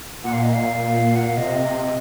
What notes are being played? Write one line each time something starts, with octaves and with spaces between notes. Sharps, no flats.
A#2 F#5
F5
D#5
F5
F#5
F5
C3 D#5